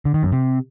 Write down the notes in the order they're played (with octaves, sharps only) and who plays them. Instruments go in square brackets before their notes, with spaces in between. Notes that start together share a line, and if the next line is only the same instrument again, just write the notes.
[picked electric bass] D3
D#3
F#2
C3